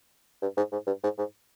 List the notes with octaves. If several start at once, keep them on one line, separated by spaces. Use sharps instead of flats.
G2
G#2
G#2
G2
G#2
G#2